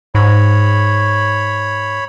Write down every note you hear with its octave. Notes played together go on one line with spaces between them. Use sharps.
G#2 C#5 B5